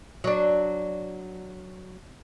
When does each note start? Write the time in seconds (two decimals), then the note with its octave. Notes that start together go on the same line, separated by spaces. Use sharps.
0.24 F#3 D4